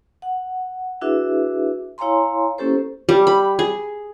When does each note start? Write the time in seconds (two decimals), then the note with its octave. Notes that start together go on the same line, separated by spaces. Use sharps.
0.22 F#5
1.01 D4 E4 F#4 G#4 B4 E5
1.98 E4 C#5 F5 G#5 A#5 C6
2.58 A#3 C#4 E4 G4 A4 C5
3.09 G3
3.27 B5
3.59 G#4